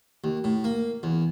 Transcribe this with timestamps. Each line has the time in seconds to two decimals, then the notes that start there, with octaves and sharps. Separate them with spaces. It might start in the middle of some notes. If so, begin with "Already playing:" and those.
0.24 D#2
0.44 A2
0.64 A#3
1.03 E2